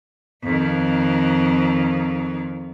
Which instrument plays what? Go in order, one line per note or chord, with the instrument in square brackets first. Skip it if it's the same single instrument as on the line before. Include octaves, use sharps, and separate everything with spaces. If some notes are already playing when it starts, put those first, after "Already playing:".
[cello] F2 D#3